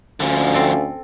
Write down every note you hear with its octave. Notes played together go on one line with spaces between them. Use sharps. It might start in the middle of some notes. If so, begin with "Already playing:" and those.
D2 D3 F3 C#4 F5 G#5
C4 A4